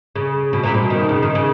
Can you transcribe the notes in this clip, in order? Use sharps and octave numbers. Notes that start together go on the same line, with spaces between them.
C#3
B2
A#2
B2
D#3
C#3
D#3
C#3